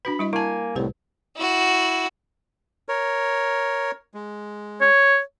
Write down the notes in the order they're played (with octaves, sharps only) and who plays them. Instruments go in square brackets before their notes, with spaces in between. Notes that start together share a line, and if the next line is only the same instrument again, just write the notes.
[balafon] D4 F#4 B4 [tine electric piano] B5
[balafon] G3 E4 D#5
[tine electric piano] A#3 G#5 [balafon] E4 A5
[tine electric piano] C2 A2 [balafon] G4 B4 C5
[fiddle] E4 F#4
[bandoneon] A#4 C#5
G#3
[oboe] C#5